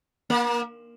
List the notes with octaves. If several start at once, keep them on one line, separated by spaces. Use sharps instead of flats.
A#3